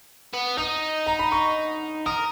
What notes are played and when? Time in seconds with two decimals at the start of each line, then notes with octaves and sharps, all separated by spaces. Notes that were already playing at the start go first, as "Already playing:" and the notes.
0.33 B3
0.58 D#4 D#6
1.07 A#5
1.19 B5
1.32 C#6
2.06 A#4 D#6